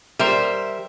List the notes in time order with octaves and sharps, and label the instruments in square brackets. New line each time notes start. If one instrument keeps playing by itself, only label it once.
[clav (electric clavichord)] G3 A#4 C5 [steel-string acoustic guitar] E5